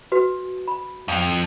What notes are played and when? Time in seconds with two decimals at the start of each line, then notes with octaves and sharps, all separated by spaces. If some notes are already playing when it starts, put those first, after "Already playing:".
0.12 F#4 B4
0.68 B5
1.08 F2 F5 G5